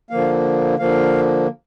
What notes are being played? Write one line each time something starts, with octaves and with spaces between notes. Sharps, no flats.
D3 F3 A#3 F5
D3 F3 A#3 F5